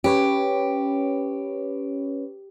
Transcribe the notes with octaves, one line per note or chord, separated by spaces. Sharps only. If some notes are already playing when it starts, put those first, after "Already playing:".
C#4 G4 B4 C#5